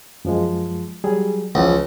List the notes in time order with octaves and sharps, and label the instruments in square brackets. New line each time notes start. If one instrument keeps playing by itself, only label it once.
[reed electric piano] F#2 F3 G#3
F#3 G3 G#4
[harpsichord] C#2 [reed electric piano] E3 F3